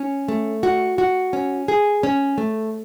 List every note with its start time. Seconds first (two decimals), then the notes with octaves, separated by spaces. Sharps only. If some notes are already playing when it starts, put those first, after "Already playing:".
Already playing: C#4
0.28 A3
0.63 F#4
0.98 F#4
1.33 C#4
1.68 G#4
2.03 C#4
2.38 A3